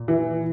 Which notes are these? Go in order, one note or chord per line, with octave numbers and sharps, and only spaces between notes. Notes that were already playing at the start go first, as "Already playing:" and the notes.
Already playing: A#2
E3